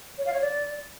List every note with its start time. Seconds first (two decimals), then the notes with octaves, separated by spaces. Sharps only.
0.18 C#5
0.26 F5
0.34 C#5
0.41 D5